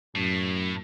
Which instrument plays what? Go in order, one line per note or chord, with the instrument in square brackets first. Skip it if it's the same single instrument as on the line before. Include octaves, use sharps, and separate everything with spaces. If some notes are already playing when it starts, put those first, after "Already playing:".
[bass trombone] F#2 [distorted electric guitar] A2